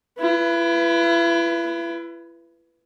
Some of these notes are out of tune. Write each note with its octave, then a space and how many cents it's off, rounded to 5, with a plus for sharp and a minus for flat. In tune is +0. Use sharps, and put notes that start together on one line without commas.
E4 +40 B4 +0